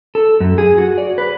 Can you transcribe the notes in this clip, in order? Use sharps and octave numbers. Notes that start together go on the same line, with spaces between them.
A4
F#2
G#4
F#4
D5
B4